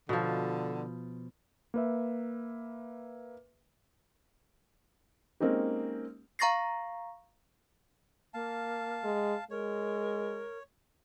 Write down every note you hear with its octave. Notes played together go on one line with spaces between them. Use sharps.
B2 D3 F3
A#3 B4 E5
G#3 A#3 C4 C#4 D#4 G4
F5 A#5 C#6 A6 A#6 C7
A#3 F5 A5
G#3
G#3 A#4 C#5